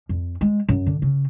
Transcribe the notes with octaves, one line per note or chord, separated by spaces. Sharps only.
F2
G#3
F#2
D3
C#3